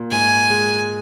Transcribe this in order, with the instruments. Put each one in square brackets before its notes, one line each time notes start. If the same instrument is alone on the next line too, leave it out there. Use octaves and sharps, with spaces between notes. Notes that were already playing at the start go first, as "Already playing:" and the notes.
Already playing: [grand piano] A#2
[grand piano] G#2 [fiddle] G#5
[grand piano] G#3